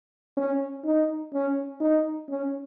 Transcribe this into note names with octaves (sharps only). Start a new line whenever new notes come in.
C#4
D#4
C#4
D#4
C#4